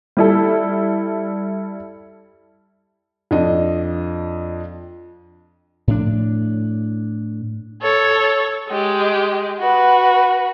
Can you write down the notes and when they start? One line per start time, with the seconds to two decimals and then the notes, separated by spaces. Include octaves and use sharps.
0.17 G3 E4 A4
3.31 F2 D4 D#5
5.88 A2 F3 D4
7.82 A4 C#5
8.70 G#3 G4
9.59 F#4 B4